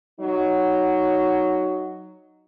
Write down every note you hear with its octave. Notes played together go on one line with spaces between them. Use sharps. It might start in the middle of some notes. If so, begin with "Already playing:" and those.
F#3 D#4